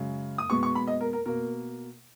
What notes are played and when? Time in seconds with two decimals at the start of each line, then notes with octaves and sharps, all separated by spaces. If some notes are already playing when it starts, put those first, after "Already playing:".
Already playing: F#2 C#3 G#3
0.38 D#6
0.50 B2 G#3 B3 C#6
0.63 C#6
0.75 B5
0.88 D#5
1.01 A#4
1.13 A#4
1.26 B2 A#3 A#4